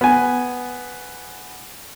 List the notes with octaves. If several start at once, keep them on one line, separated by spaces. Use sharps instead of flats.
B3 G#5